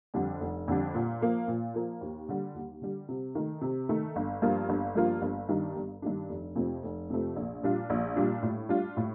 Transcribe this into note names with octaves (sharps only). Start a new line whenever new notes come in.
F2 D3 G3 D4
F1
F2 D3 G3 D4
A#2
F3 A#3
A#2
F3 A#3
D#2
D3 G3
D#2
D3 G3
C3
D#3 A3
C3
D#3 A3
G1
G2 F3 A#3 F4
G1
G2 F3 A#3 F4
G1
G2 D#3 G3 D4
G1
G2 D#3 G3 D4
F1
F2 C3 F3 A3
F1
F2 C3 F3 A3
A#1
A#2 G3 D4 F4
A#1
A#2 G3 D4 F4
A2
G3 D4 F4
A2